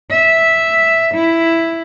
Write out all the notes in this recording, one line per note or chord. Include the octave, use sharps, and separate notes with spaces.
E5
E4